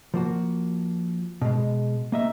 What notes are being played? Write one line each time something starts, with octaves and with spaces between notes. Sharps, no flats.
F3 A#3 F#4
B2 G#3
A#3 D#5 E5